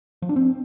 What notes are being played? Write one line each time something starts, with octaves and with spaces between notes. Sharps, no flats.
F3
D4
C4